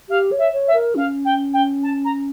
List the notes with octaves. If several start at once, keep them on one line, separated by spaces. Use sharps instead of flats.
G4 F5
C#5
E5
C#5
E5
A#4
C#4 F5
G5
G5
A5
A#5